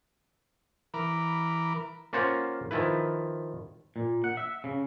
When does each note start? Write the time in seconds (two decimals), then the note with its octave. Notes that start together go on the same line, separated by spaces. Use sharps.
0.94 E3 A#4 B5 D6
2.13 A#3 C#4 F4 C5 F5 F#5
2.71 D#3 F3 E4 B4
3.96 A#2
4.24 F#5
4.37 E5
4.64 C#3